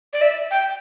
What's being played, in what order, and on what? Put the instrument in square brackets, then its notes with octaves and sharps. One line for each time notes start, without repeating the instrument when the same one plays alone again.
[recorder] D5
E5
G5